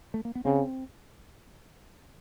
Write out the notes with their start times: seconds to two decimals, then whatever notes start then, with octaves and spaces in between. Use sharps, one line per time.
0.14 A3
0.25 A#3
0.35 B3
0.45 C#3 C4